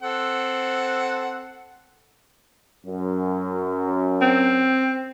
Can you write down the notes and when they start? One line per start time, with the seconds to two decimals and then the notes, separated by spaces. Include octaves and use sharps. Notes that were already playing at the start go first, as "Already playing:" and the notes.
0.02 C4 A4 F#5
2.85 F#2
4.22 C4